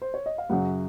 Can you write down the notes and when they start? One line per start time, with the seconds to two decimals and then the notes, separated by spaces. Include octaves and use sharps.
0.02 C5
0.14 C#5
0.26 D#5
0.38 F5
0.49 F#2 C#3 F#3 F#5